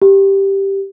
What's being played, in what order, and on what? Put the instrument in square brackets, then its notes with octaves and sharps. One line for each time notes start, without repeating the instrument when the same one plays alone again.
[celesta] G4